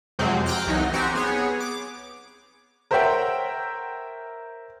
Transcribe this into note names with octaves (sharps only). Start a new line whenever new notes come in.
F2 C3 F#3 G#3 C4
G5 A#5 C6 D6 F6 F#6
C2 E3 F#3 D#4
C4 F#4 G4 C5 G#5 A#5
B3 G#4 C#5
D6
A#4 C5 C#5 E5 F#5 G5